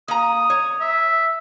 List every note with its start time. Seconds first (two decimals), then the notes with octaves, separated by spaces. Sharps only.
0.08 A#3 A#5 D#6
0.50 C#5
0.81 E5